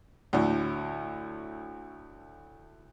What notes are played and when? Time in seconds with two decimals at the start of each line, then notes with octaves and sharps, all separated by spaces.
0.33 D2 A2